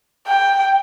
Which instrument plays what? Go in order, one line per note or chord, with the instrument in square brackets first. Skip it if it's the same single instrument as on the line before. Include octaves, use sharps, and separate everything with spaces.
[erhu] G5